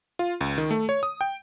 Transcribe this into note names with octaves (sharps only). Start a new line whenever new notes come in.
F4
C#2
D#3
A3
C#5
D#6
G5